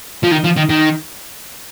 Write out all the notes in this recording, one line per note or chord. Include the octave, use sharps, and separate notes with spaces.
F3
D#3
F3
D#3
D#3